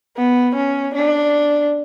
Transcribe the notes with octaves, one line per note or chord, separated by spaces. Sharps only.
B3
C#4
D4